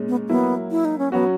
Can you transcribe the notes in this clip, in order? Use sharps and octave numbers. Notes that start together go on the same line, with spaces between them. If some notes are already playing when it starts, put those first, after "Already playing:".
Already playing: A#2 G#3 C#4
B3
F#3 A#3 B3 E4
E4
D#4
C#4
F#3 B3 C#4 F#4